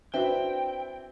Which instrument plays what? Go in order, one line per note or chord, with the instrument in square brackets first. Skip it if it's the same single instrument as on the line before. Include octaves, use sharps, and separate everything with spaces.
[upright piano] C4 D4 E4 [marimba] F#4 B4 E5 [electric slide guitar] G5